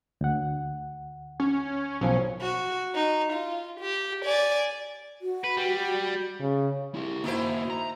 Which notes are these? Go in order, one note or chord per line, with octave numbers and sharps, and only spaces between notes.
D2 F#5
C#4
B1 F3 C#4
F#4
D#4
F4
G4
D5 G#5
F#4
B4
G3
C#3
E4 G4
D#3 A#3 E4 F#4 C5
A#5